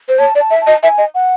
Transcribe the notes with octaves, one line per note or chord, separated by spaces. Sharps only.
C5
C#5 A5
D5
A5
E5
A5
D#5
E5 G#5
D#5
F#5